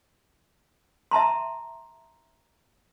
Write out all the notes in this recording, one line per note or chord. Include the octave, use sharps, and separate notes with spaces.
E5 A5 A#5 C6